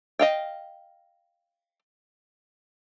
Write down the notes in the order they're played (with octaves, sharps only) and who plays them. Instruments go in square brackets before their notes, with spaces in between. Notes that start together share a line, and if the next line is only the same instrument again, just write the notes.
[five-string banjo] D#5 F5 G5